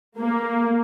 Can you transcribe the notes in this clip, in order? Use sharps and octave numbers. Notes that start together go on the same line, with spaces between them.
A#3